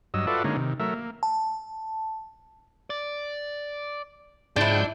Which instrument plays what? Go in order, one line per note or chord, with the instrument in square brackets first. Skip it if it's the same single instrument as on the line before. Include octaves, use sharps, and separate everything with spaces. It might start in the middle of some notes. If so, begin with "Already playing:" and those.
[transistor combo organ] G2 F#3 D#5 E6
F4 F#4 A4 B4 D5 E5
D3 G#3 A#3 C#4 D#4
C3 D#3
F#3 A3 A#4 E5
A#3
[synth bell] A5
[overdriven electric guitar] D5
[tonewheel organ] G#2 G5 G6 [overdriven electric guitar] F3 G#3 [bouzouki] D4 E4